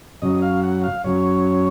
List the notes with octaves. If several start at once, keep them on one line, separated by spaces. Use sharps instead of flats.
F#2 C#3 F#3 D#5
F5
F#5
F5
F#2 C#3 F#3 C#5